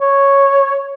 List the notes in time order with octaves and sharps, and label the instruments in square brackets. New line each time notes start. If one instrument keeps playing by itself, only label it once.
[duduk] C#5